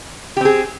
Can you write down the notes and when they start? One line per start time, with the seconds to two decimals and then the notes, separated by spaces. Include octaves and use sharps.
0.37 G4
0.41 C4
0.45 G#4